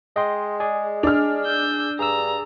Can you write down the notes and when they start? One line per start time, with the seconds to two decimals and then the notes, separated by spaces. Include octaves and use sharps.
0.16 G#3 D#5 G5 C6
0.60 G#4 D5 G#5
1.03 D4 F6
1.46 E6 G6
1.99 G2 G#4 A#5 E6